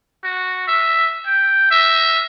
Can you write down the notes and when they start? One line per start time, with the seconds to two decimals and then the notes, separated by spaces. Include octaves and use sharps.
0.24 F#4
0.68 E5
1.26 G5
1.71 E5